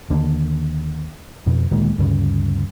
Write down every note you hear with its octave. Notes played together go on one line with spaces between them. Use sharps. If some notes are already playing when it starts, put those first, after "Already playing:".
D#2 D3
F2 B2
D2 A#2 D#3 G#3
D2 G2 C#3